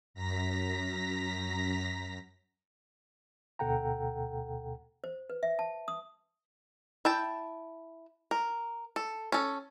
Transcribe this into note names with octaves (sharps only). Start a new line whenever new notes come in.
F#2 A#5 A#6 B6
D2 B2 A4 F#5 G5 A#5
C5
B4
E5
A5
D#6
E4 G5 A5
A#4
A4
C#4 A4